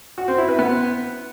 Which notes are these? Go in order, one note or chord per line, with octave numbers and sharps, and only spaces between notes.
F#4
C4
E4
B4
B3